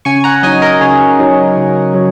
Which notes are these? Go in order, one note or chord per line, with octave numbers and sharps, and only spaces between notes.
C#3 G#5 C#6
F#5 A#5
F#3 D#4 D#5 G#5
A#4 D#5
C#3 G#4 C#5
F#3 D#4
C#3
F#3